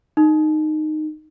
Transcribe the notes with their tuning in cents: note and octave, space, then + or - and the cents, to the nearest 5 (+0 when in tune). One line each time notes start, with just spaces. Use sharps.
D#4 -15